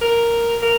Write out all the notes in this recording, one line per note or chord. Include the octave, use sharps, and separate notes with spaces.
A#4
A#4